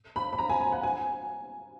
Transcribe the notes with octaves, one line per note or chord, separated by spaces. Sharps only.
B5
B5
A#5
G#5
G#5
F#5
G#5